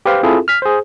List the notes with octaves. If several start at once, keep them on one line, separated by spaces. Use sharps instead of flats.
G4 B4 C5 F5
C4 E4 F4 G#4 A4
F6 B6
G#4 C5